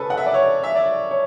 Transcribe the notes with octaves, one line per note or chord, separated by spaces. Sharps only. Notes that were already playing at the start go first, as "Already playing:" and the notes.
Already playing: C#3 A4 B4 G#5
F#5
E5
D5
C#5
E5
D5
C#5